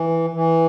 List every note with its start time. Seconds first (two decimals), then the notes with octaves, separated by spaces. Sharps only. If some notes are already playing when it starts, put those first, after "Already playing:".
Already playing: E3
0.33 E3